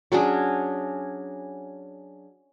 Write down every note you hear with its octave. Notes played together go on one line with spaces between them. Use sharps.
F#3 C#4 D4 G#4